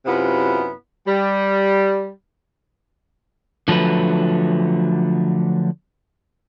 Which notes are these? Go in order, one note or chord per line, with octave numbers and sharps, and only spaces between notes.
F#2 C3 B3 E4 F4
G3
D3 F3 F#3 A3 B4